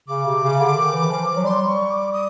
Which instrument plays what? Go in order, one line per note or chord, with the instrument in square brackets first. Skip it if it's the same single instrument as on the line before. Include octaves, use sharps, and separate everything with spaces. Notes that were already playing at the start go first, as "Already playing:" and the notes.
[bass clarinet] C#3 [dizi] D6
[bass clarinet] C3
C#3
D3
D#3
E3
F3
F#3
[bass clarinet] G3 [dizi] C6
[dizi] C#6
D6
D#6